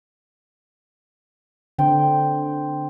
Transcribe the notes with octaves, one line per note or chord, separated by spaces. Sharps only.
D3 C4 G5